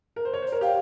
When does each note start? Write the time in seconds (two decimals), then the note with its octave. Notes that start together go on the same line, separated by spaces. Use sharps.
0.16 A#4
0.25 C5
0.33 C#5
0.42 C5
0.47 C#5
0.52 A#4
0.61 G4 F5